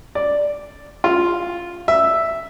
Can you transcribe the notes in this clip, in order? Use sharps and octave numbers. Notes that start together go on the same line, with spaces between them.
D5
F4
E5